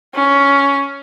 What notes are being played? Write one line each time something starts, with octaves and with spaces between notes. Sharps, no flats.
C#4